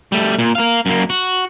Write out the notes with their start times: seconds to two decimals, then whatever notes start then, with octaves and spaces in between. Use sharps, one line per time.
0.12 G3 A3
0.39 A#2
0.55 A#4 F5
0.86 F#2 A#3
1.10 F#4